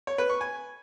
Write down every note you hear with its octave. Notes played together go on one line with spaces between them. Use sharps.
C#5
B4
C#6
G#5